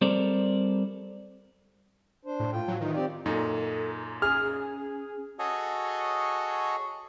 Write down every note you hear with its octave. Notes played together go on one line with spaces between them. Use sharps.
G3 C4 A4 A#4 C5 D5
D4 C5
A2
F4 G5
F#3
D#3 E3 D#4 F4
C4 G4 D5
F#2 A#2 D#4 A4
C#4 G#4 F6
F#4 G#4 A4 C#5 D#5